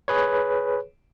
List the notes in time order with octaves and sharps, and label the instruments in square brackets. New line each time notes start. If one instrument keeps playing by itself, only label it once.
[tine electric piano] G#4 B4 C#5